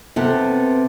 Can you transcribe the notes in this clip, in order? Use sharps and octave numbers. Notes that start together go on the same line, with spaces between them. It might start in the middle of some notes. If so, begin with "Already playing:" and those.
C3 B3 A4